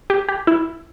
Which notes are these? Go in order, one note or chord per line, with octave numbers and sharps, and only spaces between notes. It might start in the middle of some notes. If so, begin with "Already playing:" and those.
G4
G4
E4